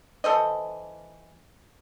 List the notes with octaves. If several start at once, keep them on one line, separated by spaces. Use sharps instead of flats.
E3 A4 C5 D#5